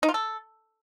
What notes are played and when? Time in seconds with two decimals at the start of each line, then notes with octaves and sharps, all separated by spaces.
0.03 D#4
0.09 F4
0.14 A4